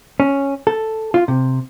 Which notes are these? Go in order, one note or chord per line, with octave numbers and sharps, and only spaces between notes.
C#4
A4
F4
C3